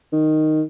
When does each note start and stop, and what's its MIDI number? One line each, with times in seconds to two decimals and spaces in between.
0.13 0.62 51